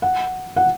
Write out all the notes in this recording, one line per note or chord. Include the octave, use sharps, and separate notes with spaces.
F#5
F#5